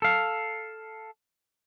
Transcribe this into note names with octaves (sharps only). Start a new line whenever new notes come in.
A4 F5